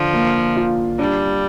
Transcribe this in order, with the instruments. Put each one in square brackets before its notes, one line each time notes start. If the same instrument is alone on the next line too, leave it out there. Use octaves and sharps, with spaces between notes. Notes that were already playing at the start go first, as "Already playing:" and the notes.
Already playing: [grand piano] D3 [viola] F3
[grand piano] A#3
F4
[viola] G3 [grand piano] D4